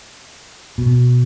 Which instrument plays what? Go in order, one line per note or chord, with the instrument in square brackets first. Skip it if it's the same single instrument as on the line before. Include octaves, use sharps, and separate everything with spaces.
[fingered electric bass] B2